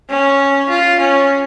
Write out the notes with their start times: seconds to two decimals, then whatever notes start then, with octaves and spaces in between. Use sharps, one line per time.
0.10 C#4
0.70 F4
1.00 C#4